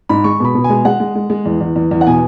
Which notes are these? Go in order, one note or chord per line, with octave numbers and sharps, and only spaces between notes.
G#2 B5
G#3 C#6
B2 B5
B2
G#5
G#3
G#3 F#5
G#3
G#3
G#3
E2
E2
E2
E2
F#5
B2 G#5